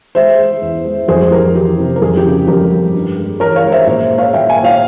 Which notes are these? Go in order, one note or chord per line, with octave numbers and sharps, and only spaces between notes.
G#3 C5 E5
G#3
E2
G#3
F2 G#4 C5
F2 G4 A#4
E3 G4
C3
A#4
F2 G#4
G4
C#3
F2 G4 A#4
G3
G2
G#3
E3 A#4 C#5
C#5 F5
G#3
C5 E5
A#2 C5 E5
G#3
C#5 F5
A#2 E5 G5
F5 G#5
A#2
C#5 F5